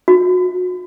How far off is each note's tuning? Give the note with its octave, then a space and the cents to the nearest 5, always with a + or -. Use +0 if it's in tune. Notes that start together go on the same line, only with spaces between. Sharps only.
F#4 -35